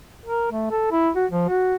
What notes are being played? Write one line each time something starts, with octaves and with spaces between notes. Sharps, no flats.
A#4
A3
A4
E4
F#4
F3
F#4